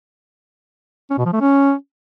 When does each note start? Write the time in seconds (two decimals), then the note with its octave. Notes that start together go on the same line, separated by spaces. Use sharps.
1.10 C#4
1.18 B2
1.26 F3
1.33 A3
1.41 C#4